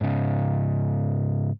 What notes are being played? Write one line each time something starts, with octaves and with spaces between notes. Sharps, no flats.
G#2 C#3